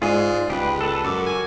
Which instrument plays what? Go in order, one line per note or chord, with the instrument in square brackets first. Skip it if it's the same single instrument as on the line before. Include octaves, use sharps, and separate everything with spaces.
[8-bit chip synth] G#2 G#3 [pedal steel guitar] F4 G#4 [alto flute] D5
[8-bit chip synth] C#2 [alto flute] G#3 [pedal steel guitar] G4 B4
[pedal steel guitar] A4 B4
[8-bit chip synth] F#2 [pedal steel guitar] F#4 D6 [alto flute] A#4
[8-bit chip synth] G#5